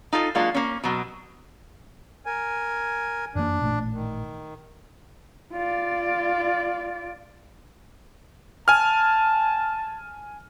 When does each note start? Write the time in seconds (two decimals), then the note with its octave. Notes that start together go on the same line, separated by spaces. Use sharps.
0.13 D#4 F4 A4
0.35 F#3 G#3 A#3 D4 F4
0.54 A#3 C#4
0.84 B2 F#3
2.26 A#4 G#5
3.35 F#2 E3 A#3 D4
3.61 A1 A#2 A3
3.93 D#3
5.53 F4 D5
8.68 G#5 A5 F6